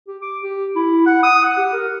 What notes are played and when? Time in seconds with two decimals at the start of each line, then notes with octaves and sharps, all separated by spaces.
0.08 G4
0.22 D6
0.43 G4
0.76 E4
1.06 F#5
1.23 D#6
1.44 F#5
1.57 G4
1.73 A#4